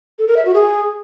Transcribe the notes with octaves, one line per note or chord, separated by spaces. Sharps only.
A4
A#4
E5
F#4
G#4